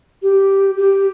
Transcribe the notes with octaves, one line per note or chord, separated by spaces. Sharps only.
G4
G4